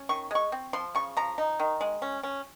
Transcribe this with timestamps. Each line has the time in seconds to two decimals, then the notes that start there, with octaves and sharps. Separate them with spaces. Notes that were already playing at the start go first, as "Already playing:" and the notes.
Already playing: C#4
0.09 D#3 C#6
0.31 G#3 C#6
0.52 C4
0.73 F3 C6
0.95 C#3 C#6
1.17 F3 A#5
1.38 D#4
1.60 D#3
1.81 G#3
2.02 C#4
2.23 C#4